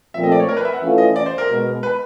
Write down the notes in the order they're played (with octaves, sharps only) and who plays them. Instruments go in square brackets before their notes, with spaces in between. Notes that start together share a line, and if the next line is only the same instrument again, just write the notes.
[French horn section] A#2 F3 A3 C4 [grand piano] E5
[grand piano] D#5
D5
C#5
A#4
B4
E5
F#5
[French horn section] E3 A3 C#4 F4
[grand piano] D#5
D5
C5
A#4
[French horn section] B2 G#3 B3
[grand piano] B4